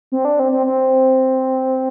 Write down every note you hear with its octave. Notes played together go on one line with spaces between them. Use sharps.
C4
D4
C4
C4
C4